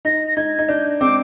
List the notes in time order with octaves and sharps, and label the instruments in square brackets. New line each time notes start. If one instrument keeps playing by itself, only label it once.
[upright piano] D#4 [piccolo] A#6
[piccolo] A#6
[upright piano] D#4 [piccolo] G#6
[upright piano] D#4
[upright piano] D4 [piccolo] G6
[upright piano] C4 [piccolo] D6